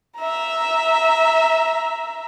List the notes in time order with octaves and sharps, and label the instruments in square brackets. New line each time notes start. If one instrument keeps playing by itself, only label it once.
[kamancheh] E5 A#5